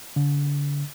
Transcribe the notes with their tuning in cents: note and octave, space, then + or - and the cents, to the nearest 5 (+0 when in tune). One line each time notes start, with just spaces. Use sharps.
D3 -35